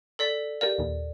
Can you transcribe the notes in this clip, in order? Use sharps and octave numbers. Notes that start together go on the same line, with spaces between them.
A4 D5 B6
G4 A#4 D5 F5
D#2 A#2